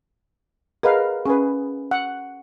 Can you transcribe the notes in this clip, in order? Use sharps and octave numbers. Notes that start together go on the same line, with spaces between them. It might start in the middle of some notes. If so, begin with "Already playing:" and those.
G#4 A#4 B4 D#5 F5
C#4 G#4 B4
F#5